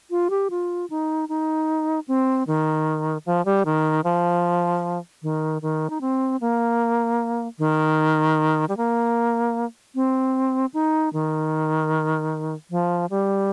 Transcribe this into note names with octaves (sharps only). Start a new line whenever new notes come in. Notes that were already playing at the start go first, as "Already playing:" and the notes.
F4
G4
F4
D#4
D#4
C4
D#3
F3
G3
D#3
F3
D#3
D#3
D#4
C4
A#3
D#3
G3
A#3
C4
D#4
D#3
F3
G3